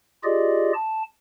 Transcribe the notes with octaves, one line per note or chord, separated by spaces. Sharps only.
F4 G4 G#4 D5 D#5
A5